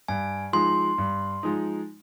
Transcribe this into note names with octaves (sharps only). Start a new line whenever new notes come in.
G2 G#5
F3 G#3 D#4 C6
G2
F3 G#3 D#4